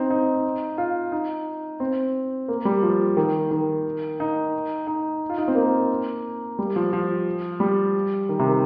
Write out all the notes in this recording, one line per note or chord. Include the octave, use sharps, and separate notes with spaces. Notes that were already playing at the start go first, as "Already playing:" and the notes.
Already playing: C4 D#4
D#4
F4
D#4
C4
A#3
G3
F3
D#3
D#3
D#4
D#4
F4
D#4
C4
A#3
G3
F3
F3
G3
D#3
C3
D#3